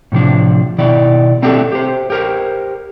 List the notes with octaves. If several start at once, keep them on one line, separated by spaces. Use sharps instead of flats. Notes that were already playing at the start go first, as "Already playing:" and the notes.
A2 C3 F3 D4
B2 D#3 E4 D5
A3 C4 D4 F#4 G4 A4
G4 C5
G4 A#4 C5